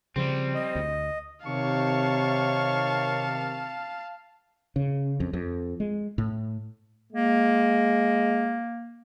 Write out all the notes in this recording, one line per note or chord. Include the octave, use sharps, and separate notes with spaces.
C#3 F3 G3 C4
D#5
D2
C3 D#3 C#5 F5 A5 C#6
C#3
F2
F2
G#3
A2
G#3 A#3